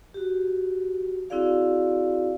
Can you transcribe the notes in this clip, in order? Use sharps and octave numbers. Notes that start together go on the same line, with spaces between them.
F#4 G4
C4 E4 F#4 G#4 D5 F5